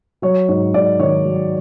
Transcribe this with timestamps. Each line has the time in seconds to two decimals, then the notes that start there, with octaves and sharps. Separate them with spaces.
0.22 F#3 C#5
0.49 G#2 C#5
0.74 G#2 D5
1.00 D#3 C#5
1.25 F#3